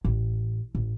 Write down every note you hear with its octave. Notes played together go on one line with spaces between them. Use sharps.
A1
A1